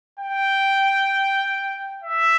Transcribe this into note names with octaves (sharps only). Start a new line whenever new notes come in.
G5
E5